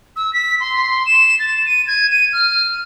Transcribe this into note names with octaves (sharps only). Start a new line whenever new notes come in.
E6
B6
C6
E7
A6
D#7
G#6
D#7
F6